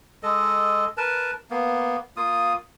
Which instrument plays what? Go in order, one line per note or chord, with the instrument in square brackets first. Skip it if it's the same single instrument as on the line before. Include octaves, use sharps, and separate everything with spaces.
[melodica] G#3 A4 D#5
A#4 B4 A5
A#3 B3
A#3 F4 D#6